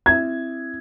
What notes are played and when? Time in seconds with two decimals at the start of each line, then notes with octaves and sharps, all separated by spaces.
0.06 C4 E4 E5 G#6